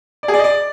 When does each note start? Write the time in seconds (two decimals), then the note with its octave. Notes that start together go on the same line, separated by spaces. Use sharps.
0.23 D5
0.28 G#4
0.34 D5
0.39 D#5
0.44 D5